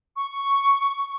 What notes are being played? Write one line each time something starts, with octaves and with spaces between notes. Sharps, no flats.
C#6